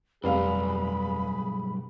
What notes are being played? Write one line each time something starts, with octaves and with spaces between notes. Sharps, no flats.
F1 B1 G2 G#4 F5 B5